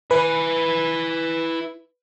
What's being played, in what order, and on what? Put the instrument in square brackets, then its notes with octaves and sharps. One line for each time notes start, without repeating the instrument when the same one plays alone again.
[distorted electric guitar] E4 G#5 [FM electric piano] B4